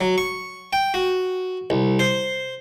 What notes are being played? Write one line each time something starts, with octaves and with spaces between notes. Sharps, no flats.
F#3
C#6
G5
F#4
C2
C5